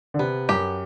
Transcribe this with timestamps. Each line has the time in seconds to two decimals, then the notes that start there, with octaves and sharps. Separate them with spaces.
0.14 D3
0.19 C3 B3
0.49 F#2 G4